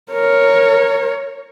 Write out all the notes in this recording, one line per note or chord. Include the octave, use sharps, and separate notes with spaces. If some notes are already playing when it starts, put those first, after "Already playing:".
A#4 C#5